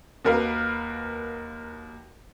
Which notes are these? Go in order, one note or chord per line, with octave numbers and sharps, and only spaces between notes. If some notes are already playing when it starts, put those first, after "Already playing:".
D#2 F#4 A#4 B4 F5